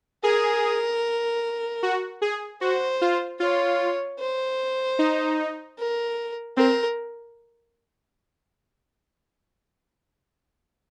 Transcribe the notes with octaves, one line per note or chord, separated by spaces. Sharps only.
G#4 A#4
F#4
G#4
F#4 C5
F4
F4 C#5
C5
D#4
A#4
C4 A#4